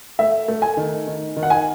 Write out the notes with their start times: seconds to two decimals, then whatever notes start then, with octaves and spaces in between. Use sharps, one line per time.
0.19 A3 E5
0.48 A3
0.62 G#5
0.77 D#3
1.07 D#3
1.37 D#3
1.43 F#5
1.50 G#5